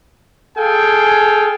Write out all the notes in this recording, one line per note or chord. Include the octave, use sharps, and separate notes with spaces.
G#4 A4 F5 G5 G#5